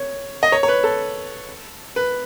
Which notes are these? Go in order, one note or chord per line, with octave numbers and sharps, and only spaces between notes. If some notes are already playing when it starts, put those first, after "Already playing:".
Already playing: C#5
D#5
C#5
C#5
B4
A4
B4